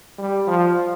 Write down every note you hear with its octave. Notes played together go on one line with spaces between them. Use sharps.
G3
F3